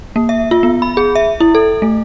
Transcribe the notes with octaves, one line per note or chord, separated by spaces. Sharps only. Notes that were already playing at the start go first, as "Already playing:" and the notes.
A#3
E5
F4
B3
B5
G#4
E5
E4
A4
A3